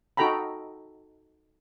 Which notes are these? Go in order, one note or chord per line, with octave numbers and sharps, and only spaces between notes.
D#4 F#4 A4 G5 A#5 B5